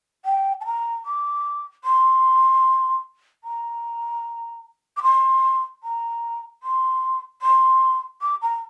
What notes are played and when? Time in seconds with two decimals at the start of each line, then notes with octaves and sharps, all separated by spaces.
0.25 G5
0.61 A5
0.65 A#5
1.05 D6
1.84 C6
3.44 A#5
4.97 D6
5.02 C6
5.83 A#5
6.63 C6
7.42 C6
8.21 D6
8.42 A#5